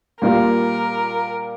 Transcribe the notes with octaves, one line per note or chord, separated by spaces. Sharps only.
A#2 G3 A#3 F4 A#4